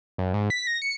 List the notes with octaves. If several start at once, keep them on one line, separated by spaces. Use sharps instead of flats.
F#2
G#2
B6
A#6
C#7